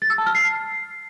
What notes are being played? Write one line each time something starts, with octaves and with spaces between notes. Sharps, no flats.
A6
E6
A5
F6
C7